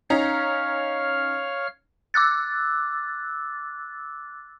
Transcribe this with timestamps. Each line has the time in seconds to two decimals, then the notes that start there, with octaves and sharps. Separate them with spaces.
0.10 C#4 D#4 C#5 F5 A#5 F6
2.14 D6 E6 F#6 A6